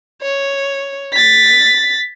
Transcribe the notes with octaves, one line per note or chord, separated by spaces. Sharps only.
C#5
A6 B6